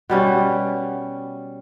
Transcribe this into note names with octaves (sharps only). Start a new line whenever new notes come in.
B2 G3 C#4